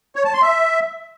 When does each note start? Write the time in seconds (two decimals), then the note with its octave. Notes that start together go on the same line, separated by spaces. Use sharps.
0.16 C#5
0.24 A5
0.33 C6
0.42 E5